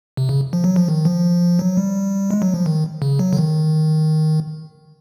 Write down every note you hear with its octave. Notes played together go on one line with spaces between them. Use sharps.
C3
C#3
F3
F#3
F3
D#3
F3
F#3
G3
G#3
F#3
F3
D#3
C#3
F#3
D3
D#3